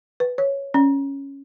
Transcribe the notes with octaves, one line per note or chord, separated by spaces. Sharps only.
B4
C#5
C#4